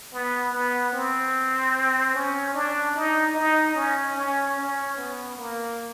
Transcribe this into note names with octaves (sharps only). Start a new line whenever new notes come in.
B3
B3
C4
C#4
D4
D#4
D#4
C#4
C#4
C#4
B3
A#3